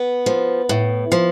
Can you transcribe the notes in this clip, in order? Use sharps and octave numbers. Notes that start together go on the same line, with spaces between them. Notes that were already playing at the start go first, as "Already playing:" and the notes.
Already playing: B3
F3
A2
F3